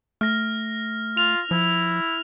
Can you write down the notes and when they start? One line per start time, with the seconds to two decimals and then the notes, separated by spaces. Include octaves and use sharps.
0.21 A3 F6 A#6
1.17 F4 F7
1.51 F3 E4